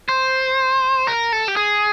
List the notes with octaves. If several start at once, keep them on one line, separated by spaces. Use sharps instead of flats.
C5
A#4
A4
G4
G#4